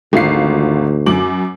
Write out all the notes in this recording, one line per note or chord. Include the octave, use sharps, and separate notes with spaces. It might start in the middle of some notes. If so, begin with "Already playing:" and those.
G#1 D2 F4 C7
F#2 D6 F#7